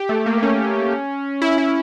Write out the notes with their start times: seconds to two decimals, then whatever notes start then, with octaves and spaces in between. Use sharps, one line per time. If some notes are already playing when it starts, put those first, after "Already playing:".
Already playing: G4
0.09 A3
0.26 A#3
0.38 A#3
0.43 C#4
1.42 E4
1.58 E4